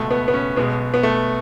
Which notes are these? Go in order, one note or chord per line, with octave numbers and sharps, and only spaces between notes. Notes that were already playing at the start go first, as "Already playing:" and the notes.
Already playing: C#2 B2 G#3 A3
B3
B3
C#4
B1 B2 G#3 B3
B3
A3